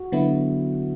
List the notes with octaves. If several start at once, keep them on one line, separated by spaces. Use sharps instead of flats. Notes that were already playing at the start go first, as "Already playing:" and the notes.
Already playing: F#4
D3 F#3 B3 E4